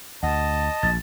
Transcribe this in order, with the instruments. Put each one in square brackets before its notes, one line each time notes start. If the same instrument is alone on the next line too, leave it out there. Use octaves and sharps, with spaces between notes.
[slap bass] D2 [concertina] D#5 [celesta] F#5 [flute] A5
[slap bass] A#1 [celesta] A6